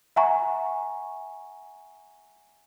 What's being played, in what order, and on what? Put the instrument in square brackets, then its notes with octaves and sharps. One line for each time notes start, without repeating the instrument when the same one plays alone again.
[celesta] E5 F#5 G#5 A#5 C#6